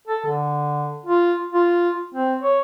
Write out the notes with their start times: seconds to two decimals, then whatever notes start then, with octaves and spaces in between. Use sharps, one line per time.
0.08 A4
0.26 D3
1.06 F4
1.53 F4
2.15 C4
2.42 C#5